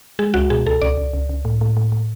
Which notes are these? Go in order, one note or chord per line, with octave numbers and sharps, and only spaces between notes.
G#3 G#4
C#2 F#4
B2 G#4
C#2 A4
C#2 D5
C#2
C#2
C#2
A2
A2
A2
A2